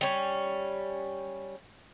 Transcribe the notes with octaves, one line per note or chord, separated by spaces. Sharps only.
G3 C#4